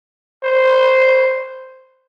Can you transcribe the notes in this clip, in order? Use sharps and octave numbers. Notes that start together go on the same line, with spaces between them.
C5